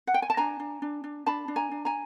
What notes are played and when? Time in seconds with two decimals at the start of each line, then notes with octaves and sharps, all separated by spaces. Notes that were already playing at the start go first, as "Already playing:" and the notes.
0.07 F#5
0.14 G5
0.22 G#5
0.30 A5
0.37 D4 G#5 A#5
0.60 D4
0.82 D4
1.04 D4
1.26 D4 A5 B5
1.48 D4
1.56 G#5 A#5
1.71 D4
1.85 G#5 A#5